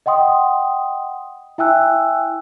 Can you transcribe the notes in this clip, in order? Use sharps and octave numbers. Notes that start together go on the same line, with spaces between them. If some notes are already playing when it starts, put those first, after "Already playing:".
D#5 F#5 G5 C6 D#6
E4 E5 G5 G#5 E6 F#6